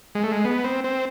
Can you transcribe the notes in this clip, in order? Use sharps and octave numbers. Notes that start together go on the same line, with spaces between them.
G#3
A3
G#3
B3
C4
C4